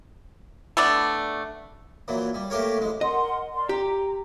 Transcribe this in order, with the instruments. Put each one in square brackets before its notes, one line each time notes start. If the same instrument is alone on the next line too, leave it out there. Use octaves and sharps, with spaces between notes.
[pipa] A3 B3 D4 D5
[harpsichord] A#2 E3 F#3
G3
A3 A#3 G4 A#4 C#5
A1 G#3
[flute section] A#4 F#5 C6 [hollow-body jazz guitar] D#5
[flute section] A#4 D5 C6
[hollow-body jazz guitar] G4 [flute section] A#5